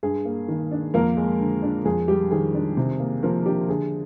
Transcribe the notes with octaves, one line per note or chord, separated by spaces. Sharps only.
G2 G#4
A#3
D#3
D4
F2 A#3 A#4
G#3
D3
D4
F2 G#4
G3 G4
D#3 G#4
D4
C3
A#3
F3 A#3 A#4
D4 G4
D3 G#4